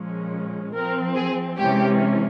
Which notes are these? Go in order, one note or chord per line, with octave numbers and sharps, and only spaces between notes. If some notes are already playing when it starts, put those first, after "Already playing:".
Already playing: A#2 F3 G#3 C#4
F3 C4 A#4
G#4
C3 E3 G#3 C#4 G4